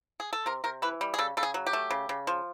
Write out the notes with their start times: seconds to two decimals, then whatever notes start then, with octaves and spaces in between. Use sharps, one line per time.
0.20 G#4
0.33 A4
0.46 C3 A#4
0.64 C3 A#4
0.82 E3 B4
1.01 G3
1.14 G#4
1.18 C#3 A4
1.37 C#3 A4
1.43 G#4
1.54 F#3
1.66 G4
1.73 A3
1.91 C#3
2.09 C#3
2.27 F3